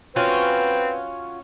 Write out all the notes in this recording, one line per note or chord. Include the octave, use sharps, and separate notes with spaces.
C4 C#4 F4 F#4 B4